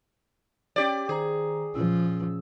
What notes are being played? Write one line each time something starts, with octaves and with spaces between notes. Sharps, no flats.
C#4 G4 C#5 D5
D#3 G#4 C5 A#5
A#2 F3 C#4 E6